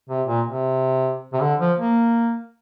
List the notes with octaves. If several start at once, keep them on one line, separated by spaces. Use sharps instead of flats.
C3
A#2
C3
C3
D3
F3
A#3